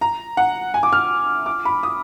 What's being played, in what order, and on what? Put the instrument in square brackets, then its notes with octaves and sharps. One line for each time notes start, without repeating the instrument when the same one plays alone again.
[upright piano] A#5
F#5
G#5
D6
F6
D6
B5
D#6